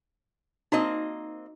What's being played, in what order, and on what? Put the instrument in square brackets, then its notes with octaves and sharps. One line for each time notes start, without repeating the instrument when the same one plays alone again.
[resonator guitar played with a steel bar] A#3 C4 D#5 [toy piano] D#4 F#4